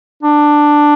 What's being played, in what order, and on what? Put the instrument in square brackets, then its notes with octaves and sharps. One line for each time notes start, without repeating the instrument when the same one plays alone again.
[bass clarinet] D4